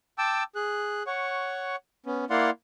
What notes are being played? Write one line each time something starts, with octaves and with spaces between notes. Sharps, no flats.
G5 A5 D6 E6
G#4 F#6
C#5 F#5 C#6
B3 C#4
A#3 E4 D5 F5 F#5 C6